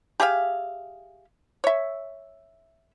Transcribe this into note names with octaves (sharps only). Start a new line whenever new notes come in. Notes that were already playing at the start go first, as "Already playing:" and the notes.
G4 G#4 E5 F5
C#5 E5